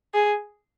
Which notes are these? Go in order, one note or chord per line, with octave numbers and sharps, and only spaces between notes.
G#4